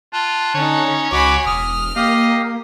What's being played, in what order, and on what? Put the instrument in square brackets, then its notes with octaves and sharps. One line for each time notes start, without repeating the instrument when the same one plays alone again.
[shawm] F4 [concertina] A5 F#6
[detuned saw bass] D3 [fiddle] C#4 D#4 [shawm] C#5
[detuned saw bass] C#2 [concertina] F#4 D6 [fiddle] G#5 B5
[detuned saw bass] E1 [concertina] D#6 [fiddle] F6
[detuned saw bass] A#3 [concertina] G4 F5 [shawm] D#5